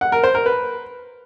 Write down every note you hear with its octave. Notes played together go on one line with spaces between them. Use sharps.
F#5
A#4
C5
A#4
B4